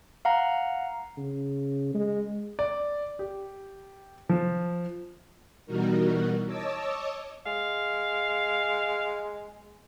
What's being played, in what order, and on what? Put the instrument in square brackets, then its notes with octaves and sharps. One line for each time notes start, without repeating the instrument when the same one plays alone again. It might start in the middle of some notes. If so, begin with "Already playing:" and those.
[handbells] F5 F#5 A#5
[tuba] C#3
G#3
[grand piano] D5
G4
F3
[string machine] B2 E3 G3 D#4 F#4 A#4
C#5 D#5 A5 D6 E6
[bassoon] G#3 [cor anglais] F5